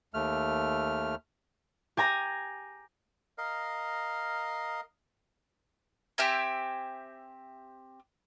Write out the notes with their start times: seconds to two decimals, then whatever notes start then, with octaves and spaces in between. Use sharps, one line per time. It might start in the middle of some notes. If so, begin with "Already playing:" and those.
0.14 D#2 A3 F6
1.97 G4 G#5 A#5
3.38 A#4 D#5 F5
6.18 C4 G4 E5 G#5